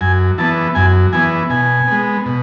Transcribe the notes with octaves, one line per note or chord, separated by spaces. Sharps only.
F#2 G#5
E3 B3 A5
F#2 G#5
E3 B3 G#5
B2 G#5
G#3 B3
B2